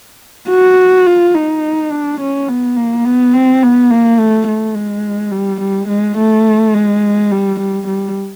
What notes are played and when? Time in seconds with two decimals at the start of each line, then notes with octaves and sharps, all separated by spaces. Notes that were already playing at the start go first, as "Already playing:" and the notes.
0.49 F#4
1.07 F4
1.35 D#4
1.91 D4
2.20 C#4
2.48 B3
2.76 A#3
3.05 B3
3.33 C4
3.62 B3
3.90 A#3
4.19 A3
4.47 A3
4.75 G#3
5.32 G3
5.61 G3
5.88 G#3
6.18 A3
6.74 G#3
7.31 G3
7.60 G3
7.88 G3